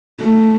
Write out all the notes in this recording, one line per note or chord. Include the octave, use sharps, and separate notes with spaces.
A3